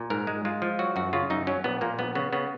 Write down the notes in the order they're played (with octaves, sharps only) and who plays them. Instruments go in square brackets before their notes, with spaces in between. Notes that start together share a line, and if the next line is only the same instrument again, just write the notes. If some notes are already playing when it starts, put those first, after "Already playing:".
Already playing: [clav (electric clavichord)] A#2
G#2 A#4
G#3
G#3 F4
F3
F#3 F#4
F#2 F#4
C#3 F4
F#2 D#4
F#3 C#4
A#1 B3
A#2 A#3
A#1 B3
C#3 B3
C#3 B3